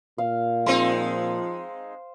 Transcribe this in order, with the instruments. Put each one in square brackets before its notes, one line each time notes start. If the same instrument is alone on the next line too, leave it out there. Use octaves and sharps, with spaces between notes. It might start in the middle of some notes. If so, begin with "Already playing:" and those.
[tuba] A#2 [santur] F5
[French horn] F3 [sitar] G#3 C4 D#4 [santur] C5